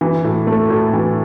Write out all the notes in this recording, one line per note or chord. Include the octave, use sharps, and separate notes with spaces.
E3
A2
A3
A2
E3